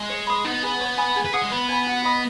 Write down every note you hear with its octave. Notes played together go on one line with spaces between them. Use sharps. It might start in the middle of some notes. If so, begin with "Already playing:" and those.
Already playing: G#3
C#5
B5 D#6
B3 D#4
G#4 B4
C#5
G#5 B5 D#6
G#4
B4
G#4 C#5 F#5 D#6
G#3
B3 B4
G#5 B5
F#4
D#5 B5 D#6